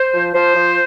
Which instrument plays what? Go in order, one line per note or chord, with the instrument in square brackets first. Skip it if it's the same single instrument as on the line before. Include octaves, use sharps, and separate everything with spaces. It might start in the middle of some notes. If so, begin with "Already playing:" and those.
Already playing: [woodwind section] C5
F3
F3 C5
F3